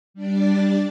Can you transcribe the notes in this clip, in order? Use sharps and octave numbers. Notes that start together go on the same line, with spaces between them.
G3 D4 D5